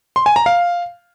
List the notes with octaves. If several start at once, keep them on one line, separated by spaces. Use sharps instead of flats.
C6
G#5
A#5
F5